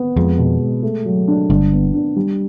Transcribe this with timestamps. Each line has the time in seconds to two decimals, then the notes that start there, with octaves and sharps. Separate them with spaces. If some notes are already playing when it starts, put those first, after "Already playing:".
Already playing: B3
0.16 F2 G#3
0.38 B2
0.60 G#3
0.83 A3
1.05 F#3
1.28 D4
1.49 G1 G2 D4
1.72 B3
1.94 D4
2.16 G3